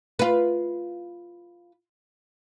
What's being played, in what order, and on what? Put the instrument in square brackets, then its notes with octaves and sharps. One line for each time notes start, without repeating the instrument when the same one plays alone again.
[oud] F4 B4